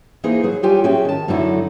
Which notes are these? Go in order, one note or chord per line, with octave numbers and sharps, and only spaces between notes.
E3 A#3 D#4 G#4 C5 D#5
F#3 G#4
F#3 G3 F4 G4 G5 G#5
A3 C#4 F#4 G#4 G5
D#3 A5
F#2 D3 A3 D#4 E4 F#4